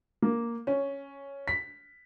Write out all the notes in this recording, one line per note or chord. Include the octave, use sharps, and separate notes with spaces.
A#3
C#4
B6